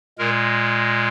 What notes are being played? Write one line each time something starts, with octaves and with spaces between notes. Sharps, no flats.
A#2 G#3 A#4